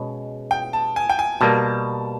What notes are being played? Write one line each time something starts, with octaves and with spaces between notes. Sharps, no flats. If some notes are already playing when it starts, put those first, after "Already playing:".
Already playing: B2 G#3 C#4
G5
A5
G#5
G5
G#5
B2 G3 A#3 A5